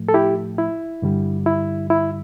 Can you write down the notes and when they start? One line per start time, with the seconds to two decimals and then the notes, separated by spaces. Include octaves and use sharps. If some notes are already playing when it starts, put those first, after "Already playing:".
Already playing: A2 F3 A3
0.09 A4
0.14 E4 G4
0.58 E4
1.02 G2 D3 G3
1.46 E4
1.90 E4